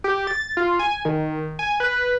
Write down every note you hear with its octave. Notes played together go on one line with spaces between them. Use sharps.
G4
A6
F4
G#5
D#3
G#5
B4